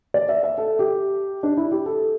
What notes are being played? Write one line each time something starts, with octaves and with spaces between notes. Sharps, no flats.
D5
E5
E5
A4
G4
D4
E4
G4
A4